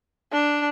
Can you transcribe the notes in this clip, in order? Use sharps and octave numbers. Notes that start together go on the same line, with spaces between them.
D4